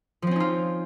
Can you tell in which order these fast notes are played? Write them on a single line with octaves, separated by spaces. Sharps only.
F3 C4 C#4 D#4 F4